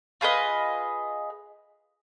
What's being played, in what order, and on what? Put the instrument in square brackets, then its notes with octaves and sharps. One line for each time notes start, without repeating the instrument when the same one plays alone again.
[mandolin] F4 G#4 B4 D#5